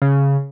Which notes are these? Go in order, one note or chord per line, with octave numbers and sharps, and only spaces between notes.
C#3